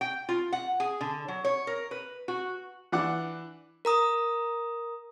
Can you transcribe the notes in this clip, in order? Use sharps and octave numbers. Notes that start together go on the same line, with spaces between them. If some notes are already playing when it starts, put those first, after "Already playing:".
G5
F4
F#5
G#4
D3
F#3
C#5
A#4
B4
F#4
E3 D4 F#5 D6
A#4 A#5 D#6